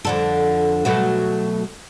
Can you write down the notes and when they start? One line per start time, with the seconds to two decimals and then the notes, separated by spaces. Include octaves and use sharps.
0.05 F2 D3 A4
0.85 B2 F#3 A3